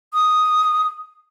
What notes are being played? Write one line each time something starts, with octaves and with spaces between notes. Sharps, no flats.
D#6